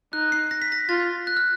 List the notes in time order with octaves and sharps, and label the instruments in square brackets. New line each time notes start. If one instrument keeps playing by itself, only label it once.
[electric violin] D#4 [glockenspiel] F#6
[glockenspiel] C7
A#6
B6
A#6
[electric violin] F4 [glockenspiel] A6
[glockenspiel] F#6
F6